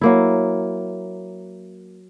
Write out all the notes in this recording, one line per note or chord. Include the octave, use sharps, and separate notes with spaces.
F#3 A#3 E4